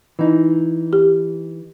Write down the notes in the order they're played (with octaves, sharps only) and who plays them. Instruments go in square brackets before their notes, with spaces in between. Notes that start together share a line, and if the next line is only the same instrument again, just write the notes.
[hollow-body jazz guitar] E3 D#4
[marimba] G4